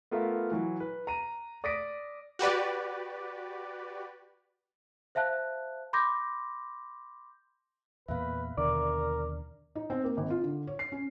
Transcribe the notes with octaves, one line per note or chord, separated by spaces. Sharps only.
A3 B3 F4 A#4 E5
E3 F#3
B4
A#5 D#7
D5 D#6 A#6 B6 D7
F#4 G4 B4 D5
C5 E5 F5 A5 F#6
B5 C6 D6 G6 A#6
E2 A#2 B3 B4 E5 F5
D#2 B2 D3 A#4 D5 D6
D#4
C4
A#3
G#1
F4
D3
C#5
C7
C#4